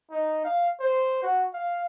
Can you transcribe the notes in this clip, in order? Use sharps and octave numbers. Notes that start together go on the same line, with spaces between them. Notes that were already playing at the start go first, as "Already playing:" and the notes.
D#4
F5
C5
F#4
F5